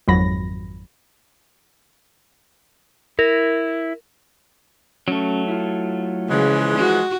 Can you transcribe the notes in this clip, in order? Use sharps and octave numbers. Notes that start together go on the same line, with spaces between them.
G#1 F2 F#3 B5 A#6
E4 A#4
F#3 A3 C#4
E4 F4
C#3 E3 F3 G#3
F#4